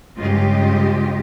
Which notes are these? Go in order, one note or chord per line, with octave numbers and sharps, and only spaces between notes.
G2 C#3 G#3 F4 G4 D#5